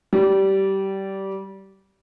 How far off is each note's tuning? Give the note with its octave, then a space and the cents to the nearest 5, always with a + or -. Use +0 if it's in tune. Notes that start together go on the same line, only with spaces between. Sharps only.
G3 -20